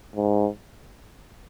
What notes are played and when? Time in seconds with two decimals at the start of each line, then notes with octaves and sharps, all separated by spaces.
0.16 G#2